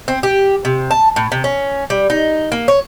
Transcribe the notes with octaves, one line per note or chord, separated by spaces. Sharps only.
C4
G4
C3
A5
A2
C3
C#4
G3
D#4
A#3
C#5